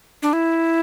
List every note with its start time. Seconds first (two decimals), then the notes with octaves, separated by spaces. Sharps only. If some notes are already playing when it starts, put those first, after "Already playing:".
0.22 D4
0.33 E4